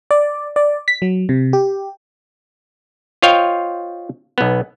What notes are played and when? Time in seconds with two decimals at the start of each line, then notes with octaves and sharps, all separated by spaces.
0.11 D5
0.56 D5
0.88 B6
1.02 F#3
1.29 C3
1.53 G4
3.22 F4 C5 C#5 D#5 F5 G5
4.38 B1 B3